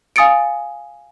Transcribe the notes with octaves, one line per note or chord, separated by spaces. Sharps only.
F5 G#5 D#6 A6 C#7 D7